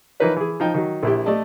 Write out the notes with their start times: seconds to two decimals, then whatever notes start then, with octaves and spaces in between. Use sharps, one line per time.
0.20 E3 F3 D#4 A#4 B4 C#5
0.36 E3 G#4
0.60 F3 D#4 G5
0.74 D#3 F#3
1.03 A#1 E4 G4
1.26 A3 G4 D5 D#5 A5